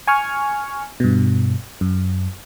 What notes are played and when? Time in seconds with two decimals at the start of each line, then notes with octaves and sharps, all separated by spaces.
0.08 G#5 C#6 F6
1.00 G2 B2
1.81 F#2